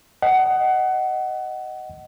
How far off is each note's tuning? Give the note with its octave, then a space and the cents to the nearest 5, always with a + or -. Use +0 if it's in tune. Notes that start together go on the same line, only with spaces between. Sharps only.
D#5 +0 F#5 +20